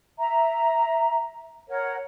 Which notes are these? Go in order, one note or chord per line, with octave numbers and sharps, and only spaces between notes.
E5 A#5
A#4 C#5 F#5